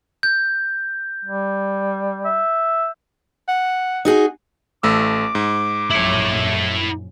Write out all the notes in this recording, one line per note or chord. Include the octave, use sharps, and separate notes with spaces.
G6
G3
E5
F#5
D#4 F#4 G#4
A1 A3 D6 E6
G#2
A#1 F#2 E4 C#5